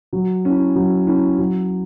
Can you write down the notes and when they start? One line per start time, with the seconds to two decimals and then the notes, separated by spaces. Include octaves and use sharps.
0.13 F#3
0.45 C#4 E4
0.76 F#3
1.07 C#4 E4
1.38 F#3